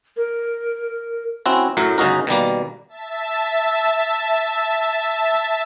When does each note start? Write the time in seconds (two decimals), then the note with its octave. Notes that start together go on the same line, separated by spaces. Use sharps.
0.17 A#4
1.46 C4 C#4 E4 F#4
1.77 F#2 A2 F#3
1.98 G1 C#3 D#4 F#4 A#4
2.27 B2 D#3 G3 A#3
2.89 E5 A5